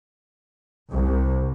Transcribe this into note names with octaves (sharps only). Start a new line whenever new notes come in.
C2